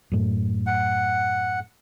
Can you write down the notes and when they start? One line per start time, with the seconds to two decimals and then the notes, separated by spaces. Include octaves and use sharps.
0.12 F#2 A2
0.67 F#5